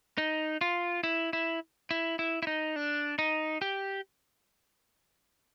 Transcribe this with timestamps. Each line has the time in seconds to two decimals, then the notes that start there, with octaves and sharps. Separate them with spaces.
0.18 D#4
0.61 F4
1.04 E4
1.33 E4
1.91 E4
2.19 E4
2.43 E4
2.47 D#4
2.76 D4
3.19 D#4
3.62 G4